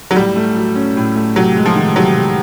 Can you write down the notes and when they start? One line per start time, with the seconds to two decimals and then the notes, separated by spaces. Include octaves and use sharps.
0.11 F#3
0.16 A2 G3
0.36 A3
0.56 F#3
0.76 C#4
0.97 A2
1.16 A3
1.36 C3 F#3
1.57 G#3
1.66 F3
1.76 D#3
1.96 C3 F#3
2.16 C3